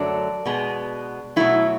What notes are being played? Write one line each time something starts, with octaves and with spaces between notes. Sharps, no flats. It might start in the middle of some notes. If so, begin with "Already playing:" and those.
Already playing: F#2 D3 F#3 A3 D4
B2 G#3 B3
B2 F#3 A3 E4